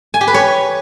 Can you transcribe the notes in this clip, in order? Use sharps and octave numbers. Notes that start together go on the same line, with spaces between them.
G#5
G4
B4
C#5